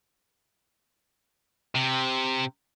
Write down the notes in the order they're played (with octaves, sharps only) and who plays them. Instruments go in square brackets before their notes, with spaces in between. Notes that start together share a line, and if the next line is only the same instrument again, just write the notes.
[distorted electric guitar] C3